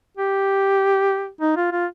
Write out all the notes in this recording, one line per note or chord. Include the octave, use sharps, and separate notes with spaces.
G4
D#4
F4
F4